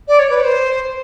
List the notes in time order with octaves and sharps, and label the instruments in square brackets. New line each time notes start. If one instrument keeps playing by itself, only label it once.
[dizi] D5
C#5
B4
C#5
C5